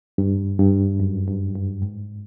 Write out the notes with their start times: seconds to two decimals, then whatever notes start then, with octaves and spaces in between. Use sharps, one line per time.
0.18 G2
0.59 G2
1.00 F#2
1.27 G2
1.55 G2
1.82 G#2